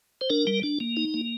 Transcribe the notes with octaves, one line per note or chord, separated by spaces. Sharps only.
C5
D4 A#4
G3
D4
A#3
D#4
A#3